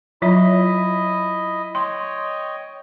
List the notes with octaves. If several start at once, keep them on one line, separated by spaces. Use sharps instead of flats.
F#3 E4 F4 D#5 E5
C#5 D#5 G5 C6